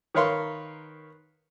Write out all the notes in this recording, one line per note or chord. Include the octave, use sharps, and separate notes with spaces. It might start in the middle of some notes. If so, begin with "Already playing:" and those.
D#3 A#4 B4 C#5 F5 C6